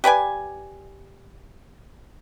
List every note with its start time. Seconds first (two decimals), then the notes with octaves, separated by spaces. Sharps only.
0.04 G4 B4 D5 G#5